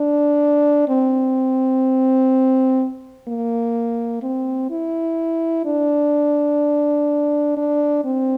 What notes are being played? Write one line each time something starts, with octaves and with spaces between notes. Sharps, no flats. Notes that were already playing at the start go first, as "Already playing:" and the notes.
Already playing: D4
C4
A#3
C4
E4
D4
D4
C4